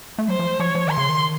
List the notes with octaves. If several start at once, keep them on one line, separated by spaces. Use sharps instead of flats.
A3
F#3 C5
F3
F3 C#5
F3
D#3 C6
C#3
D#3